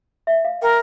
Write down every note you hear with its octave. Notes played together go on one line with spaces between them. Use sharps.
E5
F5
A#4 G5